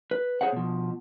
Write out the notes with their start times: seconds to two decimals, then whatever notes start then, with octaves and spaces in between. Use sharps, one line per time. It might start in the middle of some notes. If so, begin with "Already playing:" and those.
0.11 B4
0.41 G#4 C5 C#5 F#5
0.53 B2 F3